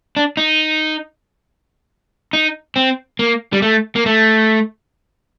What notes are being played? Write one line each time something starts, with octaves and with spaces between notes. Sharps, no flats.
D4
D#4
D#4
C4
A#3
G3
A3
A#3
A3